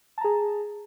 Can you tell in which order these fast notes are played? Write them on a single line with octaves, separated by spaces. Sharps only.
A5 A#5 G#4